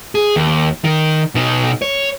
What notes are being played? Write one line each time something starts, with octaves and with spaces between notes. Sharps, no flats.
G#4
D#2
D#3
B2 D#4
C#5